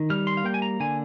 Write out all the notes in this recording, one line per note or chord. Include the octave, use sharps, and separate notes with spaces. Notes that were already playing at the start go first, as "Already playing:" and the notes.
Already playing: D#3
G3 F6
C6
F5
A#3 G5
G#5
A#5
D3 G#5